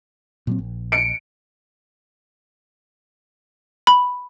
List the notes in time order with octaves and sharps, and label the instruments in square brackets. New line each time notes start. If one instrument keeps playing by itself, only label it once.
[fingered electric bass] A#2 F#3 C4
A#1
[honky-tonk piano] C#7 D7
[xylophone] B5